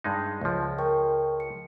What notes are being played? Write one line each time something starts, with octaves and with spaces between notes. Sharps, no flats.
G2 G#3 D#4
C#2 F3
A#4 G5 C#6
C#7